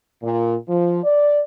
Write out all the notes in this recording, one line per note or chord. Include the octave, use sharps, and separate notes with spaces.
A#2
F3
D5